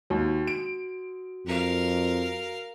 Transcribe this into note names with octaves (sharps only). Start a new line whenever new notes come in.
D#2 F#4
D7
F2 A#4 F5